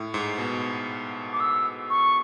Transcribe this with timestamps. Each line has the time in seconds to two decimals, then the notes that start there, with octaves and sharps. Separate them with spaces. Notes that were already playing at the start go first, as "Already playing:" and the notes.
Already playing: A2
0.14 G#2
0.38 B2
1.33 D6
1.40 E6
1.90 C#6